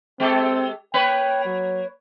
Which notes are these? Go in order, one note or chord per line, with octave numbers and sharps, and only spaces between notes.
G#3 C4 G4 A4
A#3 B4 C#5 G5
F#3